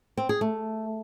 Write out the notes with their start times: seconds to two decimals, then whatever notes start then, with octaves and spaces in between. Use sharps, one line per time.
0.17 C4
0.29 G#4
0.41 A3